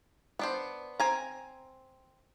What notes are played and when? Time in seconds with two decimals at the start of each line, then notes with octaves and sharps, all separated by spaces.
0.39 B3 D4 C5
1.00 C4 G#5 A#5